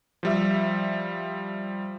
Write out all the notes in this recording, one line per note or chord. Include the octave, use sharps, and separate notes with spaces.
F3 G3 E5